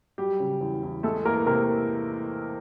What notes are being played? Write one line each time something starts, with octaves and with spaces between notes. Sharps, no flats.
F#3 G3 G4
C#3
E2
E2
G#3 A3 A4
E3 A#3 A#4
C3 A#3 A#4